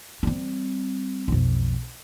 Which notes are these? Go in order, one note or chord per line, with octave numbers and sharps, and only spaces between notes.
G3 C4
B1 F2